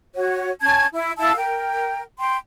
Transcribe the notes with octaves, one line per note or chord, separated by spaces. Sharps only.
F#4 C#5
C#4 A5 G#6
E4
E4 F5 A5 E6
A#4 G5
G5 C6